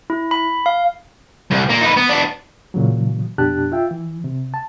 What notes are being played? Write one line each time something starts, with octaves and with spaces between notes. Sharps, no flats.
E4
B5
F5
C2
A#2 A#3
D#4 B4
B3
B3 D4
A#2 C#3 E3 F#3
F2 B2 D4 G4 A5 F#6
F4 E5 G5
E3
C3
A5